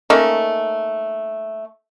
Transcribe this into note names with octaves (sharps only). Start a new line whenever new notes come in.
A3 A#3 C#4 D#4